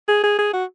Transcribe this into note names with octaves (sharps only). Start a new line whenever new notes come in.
G#4
G#4
G#4
F#4